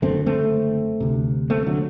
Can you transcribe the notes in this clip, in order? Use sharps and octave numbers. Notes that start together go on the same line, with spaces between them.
F#1 F#2 D3 A3 C4
A3 C4
D2 C3
A3 C4
D3 F#3